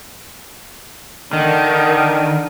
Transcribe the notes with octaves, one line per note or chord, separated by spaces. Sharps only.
D3 D#3